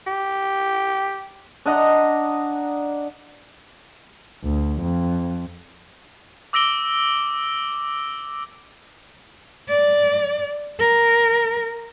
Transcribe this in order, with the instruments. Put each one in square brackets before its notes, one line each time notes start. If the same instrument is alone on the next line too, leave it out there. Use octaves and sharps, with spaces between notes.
[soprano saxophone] G4
[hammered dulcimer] D4 D#5 F#5 A#5
[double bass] D2
F2
[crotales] D6 E6 A#6 D7 G7
[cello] D5
A#4